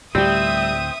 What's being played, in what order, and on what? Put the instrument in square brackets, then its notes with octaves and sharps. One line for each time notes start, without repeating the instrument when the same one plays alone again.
[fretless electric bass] D2 A2 [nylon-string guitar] G3 G4 [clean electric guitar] C4 [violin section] E5 D#6